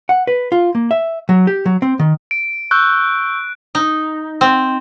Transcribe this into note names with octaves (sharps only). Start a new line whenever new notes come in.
F#5
B4
F4
A#3
E5
F#3
G4
F#3
C4
D#3
D7
C#6 E6 F#6 G6
D#4
C4